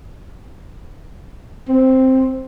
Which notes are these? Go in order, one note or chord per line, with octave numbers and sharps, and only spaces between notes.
C4